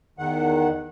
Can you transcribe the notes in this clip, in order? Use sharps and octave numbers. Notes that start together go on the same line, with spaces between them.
E2 D#3 F#5